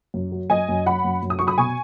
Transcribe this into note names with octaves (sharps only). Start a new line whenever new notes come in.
F#2
F#3
F#2 D#5 G#5
F#2
F#3 F#5 B5
F#2
F#2
D#6
F#3 C#6
B5 D#6
B2 G#5 C#6